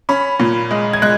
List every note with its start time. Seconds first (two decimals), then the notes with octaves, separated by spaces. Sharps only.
0.09 C#4 B5
0.40 A#2
0.71 G#3
0.93 G#6
1.02 G#3 F#6